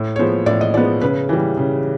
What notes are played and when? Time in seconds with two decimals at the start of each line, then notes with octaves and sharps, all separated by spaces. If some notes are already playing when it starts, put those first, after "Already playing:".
Already playing: A2
0.16 C#5
0.19 F3 G#3 B3 C5
0.46 A2 D5
0.61 D#5
0.74 F3 G#3 B3 D5
1.01 C#3 B4
1.29 E3 G3
1.57 C#3